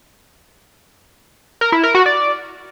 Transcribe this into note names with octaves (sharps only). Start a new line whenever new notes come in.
A#4
E4
A#4
F#4
D5